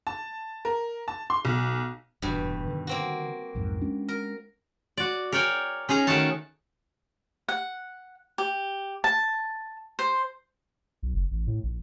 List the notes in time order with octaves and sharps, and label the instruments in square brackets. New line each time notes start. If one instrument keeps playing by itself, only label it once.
[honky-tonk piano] A5
A#4
A5
C6
B1
[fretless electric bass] D#1 E2 [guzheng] G2 B2
[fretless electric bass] D3 D#3
[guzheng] A#3 C4 F#4
[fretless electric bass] B1 F2 G#2
G#3 C#4 D4
[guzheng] A#4
[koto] F#4 D5
A#4 C#5 D5 G5 G#5
C#4 D#4 G#4 A#5
D#3 A3 D#4 F#4 C#5 A5
[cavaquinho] F#5
G4
A5
C5
[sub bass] B1
F#1
A1
A2
A#1